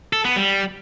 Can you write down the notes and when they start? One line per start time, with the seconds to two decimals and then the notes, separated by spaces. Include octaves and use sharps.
0.13 A4
0.25 B3
0.36 G3